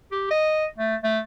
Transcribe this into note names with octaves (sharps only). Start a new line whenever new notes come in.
G4
D#5
A3
A3